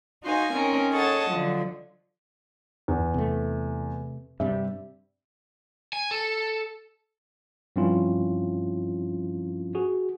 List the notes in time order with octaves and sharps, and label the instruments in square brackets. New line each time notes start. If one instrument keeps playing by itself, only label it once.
[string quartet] D#4 F#4 C5 F5 G#5
C4 C#4 D#4 A#4
G#4 A4 C#5 D#5 F#5 A5
D3 F3 F#3
[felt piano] E2
[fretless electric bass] C3 A3
[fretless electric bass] G2 C3 G3 [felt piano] E5
[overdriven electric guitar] G#5
A4
[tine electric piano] G2 F3 C4 C#4 E4 F4
F#4 G#4